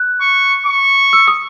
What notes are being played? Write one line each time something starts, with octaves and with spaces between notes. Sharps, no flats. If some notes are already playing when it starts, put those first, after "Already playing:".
Already playing: F#6
C#6
C#6
E6
D#6